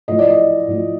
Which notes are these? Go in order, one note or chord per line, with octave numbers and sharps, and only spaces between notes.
A2 F3 A3 D#5
D5
D#5
A2 F3 A3